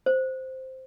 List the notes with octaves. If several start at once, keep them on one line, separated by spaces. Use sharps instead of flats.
C5